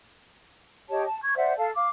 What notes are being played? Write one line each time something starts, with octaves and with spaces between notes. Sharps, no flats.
G4 C#5 D#5 A5
A5
C#6 G#6
C5 D5 E5 F#5
A4 F5 A5
F5 D6